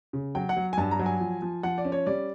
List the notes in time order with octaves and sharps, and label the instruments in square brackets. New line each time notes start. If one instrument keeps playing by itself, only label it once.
[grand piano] C#3
F#3 G5
F#5
F#3
G#5
G2 A5
A#5
F#3
G#5
F3
F3
F3 F#5
D5
C#4
C#5
G3 D5